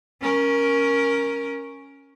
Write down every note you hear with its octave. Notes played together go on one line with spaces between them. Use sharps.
C#4 A#4